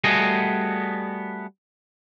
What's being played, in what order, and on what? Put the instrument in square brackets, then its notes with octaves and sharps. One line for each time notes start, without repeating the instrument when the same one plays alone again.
[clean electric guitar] G3 A3 B3 F#4 G#4 D#5